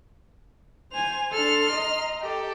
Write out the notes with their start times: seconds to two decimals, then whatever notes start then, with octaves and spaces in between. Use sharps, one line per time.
0.92 C5 G#5 F7
1.31 D4 A4 C6 F6
1.73 D#5 A#5
2.22 G4 A4